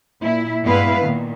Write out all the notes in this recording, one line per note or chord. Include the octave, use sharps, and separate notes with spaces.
A#2 E4
G2 G#3 B3 E4 B4 F5
A#2 D#3